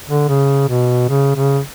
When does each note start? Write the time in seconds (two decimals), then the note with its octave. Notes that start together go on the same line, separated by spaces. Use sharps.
0.08 D3
0.28 C#3
0.69 B2
1.09 C#3
1.36 C#3